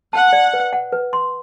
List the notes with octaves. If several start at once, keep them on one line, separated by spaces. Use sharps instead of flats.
F#5 A5
D5
B4
F#5
B4
C6